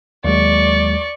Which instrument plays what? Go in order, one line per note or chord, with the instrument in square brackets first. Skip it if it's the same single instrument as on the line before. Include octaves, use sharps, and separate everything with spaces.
[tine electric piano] D#2 F#3 G#3 [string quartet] D5 C#6